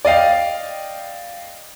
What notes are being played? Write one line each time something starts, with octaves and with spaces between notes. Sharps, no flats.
D5 D#5 F5 G5